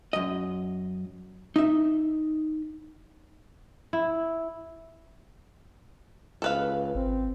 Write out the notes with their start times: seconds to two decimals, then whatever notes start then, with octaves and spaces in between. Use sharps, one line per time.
0.13 F#2 D#5
1.56 D#4 E5
3.93 E4
6.42 C#2 A4 B4 F5
6.95 G#1 C4